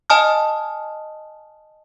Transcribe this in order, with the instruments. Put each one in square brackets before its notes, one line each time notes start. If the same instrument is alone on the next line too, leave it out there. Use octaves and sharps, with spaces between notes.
[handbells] D#5 G#5 A5 D#6 F6